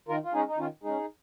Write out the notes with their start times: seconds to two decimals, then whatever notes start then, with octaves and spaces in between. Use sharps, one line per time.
0.08 D#3 F4 A#4
0.24 F4
0.33 G#3 C#4 D#4 G#4
0.47 D#4
0.58 D#3 C#4 F4
0.83 G#3 C#4 D#4 G#4